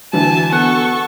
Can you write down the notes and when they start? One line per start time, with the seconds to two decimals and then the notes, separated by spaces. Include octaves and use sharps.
0.13 D3 E3 F#3 F#4 G#5 A5
0.52 B3 A4 F#5 C#6